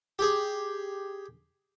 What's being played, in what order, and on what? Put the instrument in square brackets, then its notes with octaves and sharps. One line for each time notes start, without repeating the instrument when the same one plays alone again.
[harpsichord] G4 G#4